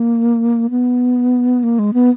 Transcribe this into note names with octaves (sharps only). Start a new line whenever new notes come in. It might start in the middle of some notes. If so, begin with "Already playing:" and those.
Already playing: A#3
B3
A#3
G#3
B3